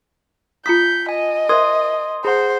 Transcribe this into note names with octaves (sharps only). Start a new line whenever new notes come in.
F4 A#5 D#6 G6 B6 C#7
D#5 G#5
A#4 C5 E5 C6 D#6 G#6
G#4 C5 F#5 A#5 C6